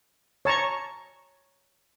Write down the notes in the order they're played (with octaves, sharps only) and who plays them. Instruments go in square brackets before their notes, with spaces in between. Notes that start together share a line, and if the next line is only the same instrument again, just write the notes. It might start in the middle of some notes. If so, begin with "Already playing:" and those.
[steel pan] C#5 A5 A#5 C#6